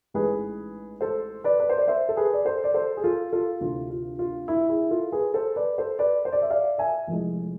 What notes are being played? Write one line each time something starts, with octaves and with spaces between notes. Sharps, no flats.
A1 G#2 G#3 G#4 B4
A4 C5
B4 D5
B4
C5
D5
C5 E5
A4
G#4 B4
D5
A4 C5
D5
A4 C5
G#4
F4 A4
F4 A4
D2 C3 E3 F4
F4
F4
E4
E4 G#4
F4 A4
G#4 B4
A4 C5
B4 D5
A4 C5
B4 D5
C5
D5
E5
D5 F5
E5 G#5
F1 F2 E3 G#3